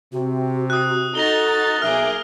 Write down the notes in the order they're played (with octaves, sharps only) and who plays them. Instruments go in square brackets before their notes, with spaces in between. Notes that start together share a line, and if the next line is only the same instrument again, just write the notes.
[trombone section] C3 [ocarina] F#4
[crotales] D#6 F#6
[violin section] D#4 F#4 A6 [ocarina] A4 [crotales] A#6 F7 G7
[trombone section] B1 [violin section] A#3 G#4 D6 [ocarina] E5 [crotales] F6